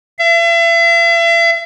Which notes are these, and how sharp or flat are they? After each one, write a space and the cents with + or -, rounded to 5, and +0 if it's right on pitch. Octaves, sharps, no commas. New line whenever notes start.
E5 +40